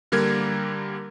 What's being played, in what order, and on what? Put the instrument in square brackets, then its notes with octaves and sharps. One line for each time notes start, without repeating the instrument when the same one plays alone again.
[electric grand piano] D3 G3 A#3 A#4 G#6